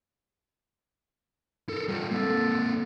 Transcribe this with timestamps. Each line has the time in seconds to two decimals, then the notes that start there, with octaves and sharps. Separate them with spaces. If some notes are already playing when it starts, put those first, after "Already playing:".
1.69 A4 A#4
1.88 G3 F4
2.11 A#3 C4 A4